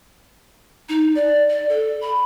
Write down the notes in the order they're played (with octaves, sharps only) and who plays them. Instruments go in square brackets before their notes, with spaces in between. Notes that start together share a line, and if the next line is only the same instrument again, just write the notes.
[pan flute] D#4
D5
D5
A4
B5